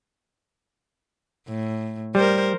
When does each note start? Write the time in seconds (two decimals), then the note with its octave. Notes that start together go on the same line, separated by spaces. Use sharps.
1.48 A2
2.15 G3 A#4 C5